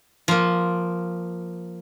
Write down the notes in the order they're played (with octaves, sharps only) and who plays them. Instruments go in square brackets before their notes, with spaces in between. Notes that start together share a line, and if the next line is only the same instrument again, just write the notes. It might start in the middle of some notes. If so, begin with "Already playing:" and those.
[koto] F3 A#3